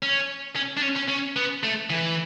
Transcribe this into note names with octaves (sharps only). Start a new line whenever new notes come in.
C#4
C#4
D4
C#4
C#4
C#4
B3
A3
E3